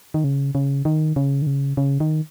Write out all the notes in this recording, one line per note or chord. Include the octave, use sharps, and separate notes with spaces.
D#3
C#3
C#3
D#3
C#3
D#3
C#3
C#3
D#3